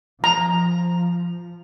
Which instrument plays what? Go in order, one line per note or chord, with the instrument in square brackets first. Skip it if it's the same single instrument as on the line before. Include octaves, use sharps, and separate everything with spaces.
[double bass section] F3 [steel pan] A#5